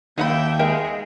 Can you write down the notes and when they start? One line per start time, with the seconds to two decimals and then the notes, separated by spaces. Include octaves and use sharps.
0.18 D#2 A#3 D#4 E5 F#5 G5 B5
0.59 G#3 G4 A#4 E5